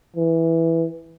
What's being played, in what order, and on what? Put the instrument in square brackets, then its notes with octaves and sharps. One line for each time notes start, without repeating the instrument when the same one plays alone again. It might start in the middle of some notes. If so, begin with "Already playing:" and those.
[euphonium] E3